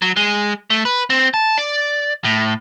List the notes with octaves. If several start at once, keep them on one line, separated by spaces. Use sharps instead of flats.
F#3
G#3
A3
B4
C4
A5
D5
A2